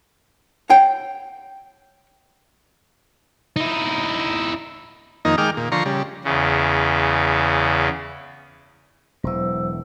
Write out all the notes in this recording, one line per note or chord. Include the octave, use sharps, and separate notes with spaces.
C#5 F#5 G5
D#4 E4
F2 D#3 A#3 D#4
D#3 G#3 G5 D6 F6
A#2
D3 F3 A#5 C6 C#6
C#3 G3
E2 C#3
E1 E3 F#3 C5 E6